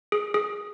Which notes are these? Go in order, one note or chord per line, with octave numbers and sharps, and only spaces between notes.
G#4
G#4